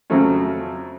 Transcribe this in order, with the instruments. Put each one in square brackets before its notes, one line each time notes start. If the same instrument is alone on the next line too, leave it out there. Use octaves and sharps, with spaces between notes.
[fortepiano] F2 C#3 F3 F#3 A3 C#4